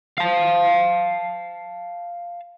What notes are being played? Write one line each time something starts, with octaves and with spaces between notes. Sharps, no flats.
F5 A5